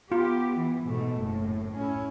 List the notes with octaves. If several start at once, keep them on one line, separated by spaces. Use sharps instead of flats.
B3 F4 G4
E3
G#2 B2 A3
F#1 A2
C#4 E4